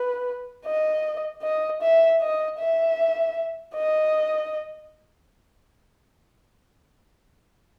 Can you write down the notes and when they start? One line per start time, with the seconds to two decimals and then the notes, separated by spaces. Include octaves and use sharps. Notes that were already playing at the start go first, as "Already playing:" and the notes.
Already playing: B4
0.66 D#5
1.43 D#5
1.82 E5
2.21 D#5
2.59 E5
3.75 D#5